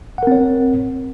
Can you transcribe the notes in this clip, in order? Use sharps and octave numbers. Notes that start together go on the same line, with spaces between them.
C4 A#4 C#5 F#5